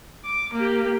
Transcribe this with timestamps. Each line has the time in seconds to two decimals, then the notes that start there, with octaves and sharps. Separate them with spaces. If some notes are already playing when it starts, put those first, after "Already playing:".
0.25 D6
0.54 A#3 G4